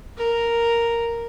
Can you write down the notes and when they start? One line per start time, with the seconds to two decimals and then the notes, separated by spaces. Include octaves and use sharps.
0.17 A#4